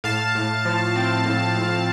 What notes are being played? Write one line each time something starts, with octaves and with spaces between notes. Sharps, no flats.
A2 F5 A5
A2
F3
C4
A2
A2